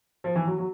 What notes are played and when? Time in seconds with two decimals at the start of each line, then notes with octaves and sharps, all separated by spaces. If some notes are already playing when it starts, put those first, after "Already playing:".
0.24 F3
0.35 E3
0.47 F#3
0.58 F#3